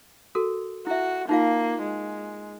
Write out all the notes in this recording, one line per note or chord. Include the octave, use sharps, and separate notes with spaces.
F#4 A4 A#4
E4 F#4 E5
A#3 D#4 F4 F5
G#3